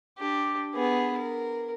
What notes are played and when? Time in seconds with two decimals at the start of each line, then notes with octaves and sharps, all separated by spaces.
0.18 D4 G4
0.75 B3 G#4
1.17 A#4